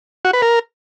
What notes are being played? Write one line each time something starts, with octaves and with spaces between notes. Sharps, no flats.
F#4
B4
A#4